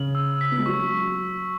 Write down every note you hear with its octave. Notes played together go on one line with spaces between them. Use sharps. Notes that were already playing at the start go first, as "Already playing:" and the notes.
Already playing: C#3 F#7
E6
B6
B3
G#3
F#3 C#6